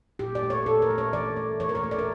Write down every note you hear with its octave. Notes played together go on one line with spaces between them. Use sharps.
A#2 G4
D5
A3
C#5
A#2 A4
A#4
A3
C#5
E3 D5
A3
E3 C#5
A#4
C#5
A3
D5
A#4